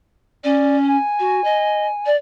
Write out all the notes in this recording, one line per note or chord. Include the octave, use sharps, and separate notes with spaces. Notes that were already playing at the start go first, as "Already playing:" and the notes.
C#4 D5
G#5
F#4
D#5
D5